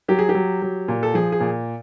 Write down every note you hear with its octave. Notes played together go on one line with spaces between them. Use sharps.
F#3 G4
G#4
G4
F#3
F#3
A#2
A4
F3 G#4
G#4
A#2